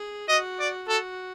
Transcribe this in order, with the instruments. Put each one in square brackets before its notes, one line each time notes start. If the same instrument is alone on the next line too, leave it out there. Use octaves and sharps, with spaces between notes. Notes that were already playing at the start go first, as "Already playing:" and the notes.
Already playing: [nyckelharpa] G#4
[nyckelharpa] F#4 [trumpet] D#5
[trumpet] D5
[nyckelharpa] F#4 [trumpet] A4